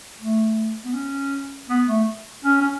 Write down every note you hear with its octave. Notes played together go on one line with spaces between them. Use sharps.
A3
B3
C#4
B3
A3
C#4
C#4